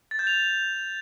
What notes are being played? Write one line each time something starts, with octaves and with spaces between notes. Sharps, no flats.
A6
G6
F7